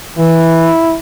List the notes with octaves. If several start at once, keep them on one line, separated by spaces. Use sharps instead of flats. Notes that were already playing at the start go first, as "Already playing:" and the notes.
E3 E4